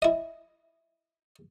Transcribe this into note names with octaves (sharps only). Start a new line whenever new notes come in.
E4 D#5